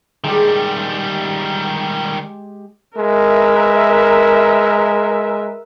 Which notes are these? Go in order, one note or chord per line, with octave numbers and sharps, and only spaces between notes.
D#3 G3 G#3 G4
G#3 A#4 B4 E5